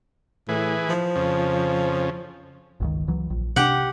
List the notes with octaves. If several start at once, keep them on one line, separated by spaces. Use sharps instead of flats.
A2 E3 G#4 B4
F3
F2 C#3
G1 C#2 D#3
C#2 E3 F#3
A#1
C3 D4 G4 F#5